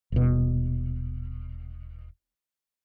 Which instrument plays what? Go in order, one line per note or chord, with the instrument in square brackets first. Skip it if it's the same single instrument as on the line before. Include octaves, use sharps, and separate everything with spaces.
[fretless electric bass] D#1 B2